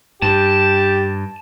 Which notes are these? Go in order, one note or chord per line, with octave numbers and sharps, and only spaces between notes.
G2 G4 A5